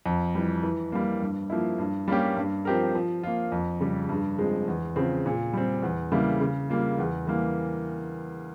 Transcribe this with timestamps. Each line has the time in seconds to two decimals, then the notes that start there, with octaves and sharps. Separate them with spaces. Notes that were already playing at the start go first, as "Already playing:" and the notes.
0.06 F2
0.35 E3 G3
0.63 E3
0.92 G3 A#3
1.22 G2
1.50 F3 A#3 E4
1.79 G2
2.08 G3 A#3 C#4 G4
2.37 G2
2.65 F3 C4 G4 A#4
2.95 F3
3.23 A#3 F4
3.52 F2
3.80 C#3 G3
4.09 G2
4.38 F3 G#3 C4
4.68 E2
4.96 C#3 F3 C4
5.26 A#2
5.53 G3 C4
5.82 E2
6.12 C#3 G3 A#3 E4
6.41 C#3
6.70 G3 A#3 F4
6.98 E2
7.27 E3 G3 A#3